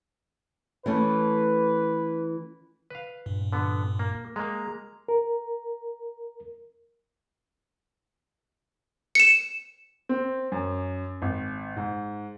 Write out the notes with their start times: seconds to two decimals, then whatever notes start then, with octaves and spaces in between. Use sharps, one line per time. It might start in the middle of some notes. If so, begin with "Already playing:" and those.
0.86 E3 A3 C#4 B4
2.90 B4 F5
3.26 G2 A#2
3.53 D3 B3
3.99 A#3
4.36 G#3 A#3 A#5
5.08 A#4
9.15 C#7 E7
10.09 C4
10.52 F#2
11.22 G#1
11.77 G#2